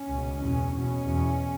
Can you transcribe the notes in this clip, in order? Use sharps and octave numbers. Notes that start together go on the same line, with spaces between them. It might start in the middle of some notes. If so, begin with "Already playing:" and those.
Already playing: C#4
C#2 B2
E2 B2 C#4
E2 B2 C#4
E2 B2